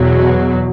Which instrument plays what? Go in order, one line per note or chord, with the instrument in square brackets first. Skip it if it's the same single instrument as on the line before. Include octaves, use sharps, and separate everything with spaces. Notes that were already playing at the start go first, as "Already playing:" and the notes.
Already playing: [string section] E2 B2 F#3